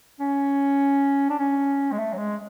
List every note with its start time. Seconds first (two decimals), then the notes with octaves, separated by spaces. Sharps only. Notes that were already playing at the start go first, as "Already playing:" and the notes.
0.20 C#4
1.30 D4
1.39 C#4
1.92 G#3
1.98 A3
2.13 F#3
2.18 G#3